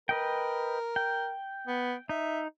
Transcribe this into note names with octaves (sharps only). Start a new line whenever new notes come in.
A#4 B4 D#5 G5
G5
B3
D#4 E5